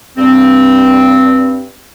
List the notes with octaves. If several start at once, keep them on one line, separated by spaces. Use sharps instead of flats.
G2 C4